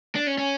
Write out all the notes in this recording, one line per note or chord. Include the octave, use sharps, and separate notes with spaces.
D4
C#4
C#4